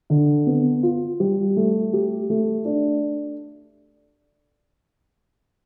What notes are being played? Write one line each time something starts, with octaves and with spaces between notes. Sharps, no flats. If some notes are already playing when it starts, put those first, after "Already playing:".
D3
B3
F4
G3
A3
G4
A3
D4